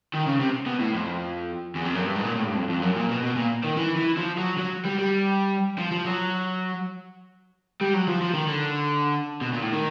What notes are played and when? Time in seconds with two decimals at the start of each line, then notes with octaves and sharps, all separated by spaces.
0.14 D#3
0.27 C#3
0.40 C3
0.66 B2
0.80 A2
0.94 F2
1.75 E2
1.85 F2
1.95 F#2
2.06 G2
2.15 G#2
2.25 A#2
2.36 A2
2.45 G2
2.55 F2
2.69 F2
2.82 F#2
2.96 A#2
3.10 B2
3.23 B2
3.37 A#2
3.64 D#3
3.77 E3
3.96 E3
4.17 F3
4.38 F#3
4.58 F#3
4.85 G3
4.98 G3
5.78 F3
5.91 F3
6.05 F#3
7.81 G3
7.94 F#3
8.08 F3
8.21 F3
8.34 D#3
8.48 D3
9.41 B2
9.53 A#2
9.62 A2
9.73 D#3